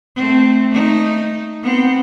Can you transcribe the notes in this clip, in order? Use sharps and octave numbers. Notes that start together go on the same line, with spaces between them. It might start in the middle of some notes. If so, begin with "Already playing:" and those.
A3 C4
A3 D#4
B3 C4